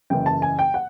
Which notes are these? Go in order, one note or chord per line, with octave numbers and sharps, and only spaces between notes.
F#1 F#2 C#3 E3 G5
A5
G#5
G5
F#5